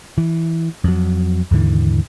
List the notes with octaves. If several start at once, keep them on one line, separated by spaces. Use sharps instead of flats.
E3
F2 F#3
D#2 G#2 D3 E3